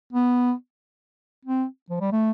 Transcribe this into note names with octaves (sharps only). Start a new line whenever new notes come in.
B3
C4
F3
G3
A3